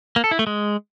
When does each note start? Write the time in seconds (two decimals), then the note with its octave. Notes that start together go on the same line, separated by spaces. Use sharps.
0.16 A#3
0.24 A4
0.31 E4
0.39 A3
0.47 G#3